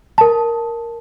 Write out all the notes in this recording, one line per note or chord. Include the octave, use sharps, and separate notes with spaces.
A#4 A5